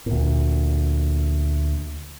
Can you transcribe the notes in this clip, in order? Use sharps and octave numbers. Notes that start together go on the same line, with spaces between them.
D2 A#2